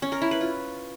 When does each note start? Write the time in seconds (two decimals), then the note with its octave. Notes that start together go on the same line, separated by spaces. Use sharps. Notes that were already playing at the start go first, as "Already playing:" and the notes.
0.02 C#4
0.12 A#4
0.22 E4
0.31 B4
0.41 F4